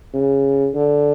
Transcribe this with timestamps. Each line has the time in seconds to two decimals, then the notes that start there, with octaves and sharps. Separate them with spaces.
0.14 C#3
0.75 D3